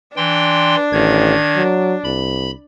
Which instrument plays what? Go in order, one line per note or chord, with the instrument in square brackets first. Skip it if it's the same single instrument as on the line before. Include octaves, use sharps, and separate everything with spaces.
[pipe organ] E3 G5 C6 [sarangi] D4
[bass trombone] A1 [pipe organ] D#3 G#6
[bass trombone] F#3
[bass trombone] C2 [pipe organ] B5